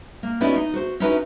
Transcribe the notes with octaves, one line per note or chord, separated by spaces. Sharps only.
A#3
B3 C#4 D#4 E4 F#4 D5
D#4
F#4 C5
C#4 D#4 E4 F#4 B4